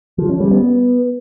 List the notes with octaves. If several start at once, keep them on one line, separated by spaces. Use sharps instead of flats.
F3
C#4
G3
B3